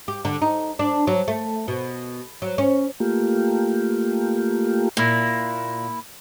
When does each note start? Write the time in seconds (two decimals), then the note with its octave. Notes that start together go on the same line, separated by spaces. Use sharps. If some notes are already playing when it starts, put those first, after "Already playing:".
0.08 G4
0.25 D3
0.42 D#4
0.79 D4
1.07 F#3
1.28 A3
1.68 B2
2.42 F#3
2.58 C#4
3.00 A3 A#3 F4 G4
4.97 A#2 A#3 E4